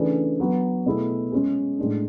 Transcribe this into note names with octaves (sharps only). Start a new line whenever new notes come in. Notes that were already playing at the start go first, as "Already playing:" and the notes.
Already playing: C#3 E3 A3 D4 G#4
F#3 B3 F#4
B2 A3 E4 G#4
G#3 C#4 G#4
A2 G#3 D4